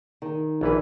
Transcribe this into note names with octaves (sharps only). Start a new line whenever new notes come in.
D#3
A#1 E3 B4